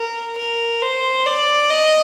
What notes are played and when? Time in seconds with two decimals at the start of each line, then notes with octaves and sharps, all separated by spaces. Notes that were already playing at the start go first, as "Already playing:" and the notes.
Already playing: A#4
0.37 A#4
0.82 C5
1.26 D5
1.70 D#5